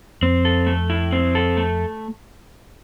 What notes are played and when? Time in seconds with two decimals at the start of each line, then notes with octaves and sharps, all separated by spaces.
0.21 F2 C4
0.45 A4
0.67 A3
0.90 E4
1.12 C4
1.35 A4
1.57 A3